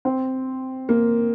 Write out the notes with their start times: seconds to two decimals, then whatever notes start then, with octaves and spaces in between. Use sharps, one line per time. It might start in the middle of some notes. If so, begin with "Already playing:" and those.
0.05 C4
0.89 A#3